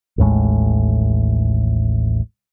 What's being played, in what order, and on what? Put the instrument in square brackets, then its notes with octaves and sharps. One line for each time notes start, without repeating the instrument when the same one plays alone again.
[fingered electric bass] A1 D#2 A2 G#3